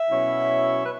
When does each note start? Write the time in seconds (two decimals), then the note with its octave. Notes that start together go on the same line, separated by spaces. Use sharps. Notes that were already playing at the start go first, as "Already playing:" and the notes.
Already playing: E5
0.09 B2 F#3 C#4 E4
0.83 B4